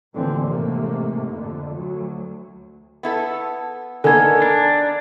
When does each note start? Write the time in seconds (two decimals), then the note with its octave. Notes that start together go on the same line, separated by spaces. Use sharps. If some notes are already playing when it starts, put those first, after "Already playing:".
0.14 A1 D#2 D3 E3 F3 C4
0.46 G#2 C3 A3 A#3
1.32 F2 D3
1.76 D2 F#3
3.03 B3 E4 A4
4.04 D3 D#3 A#3 B3 A4 G#5 G#6
4.42 D4 A#4